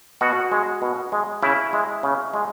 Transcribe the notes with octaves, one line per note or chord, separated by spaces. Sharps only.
B2 F#4
G#3
B2
G#3
C#3 E4
G#3
C#3
G#3